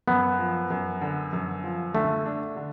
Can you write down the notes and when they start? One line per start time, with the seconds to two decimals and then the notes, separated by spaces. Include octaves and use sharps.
0.08 F#2 B3
0.39 F3
0.70 F#2
1.01 D3
1.33 F#2
1.64 F3
1.95 D3 A3
2.26 D4
2.57 D3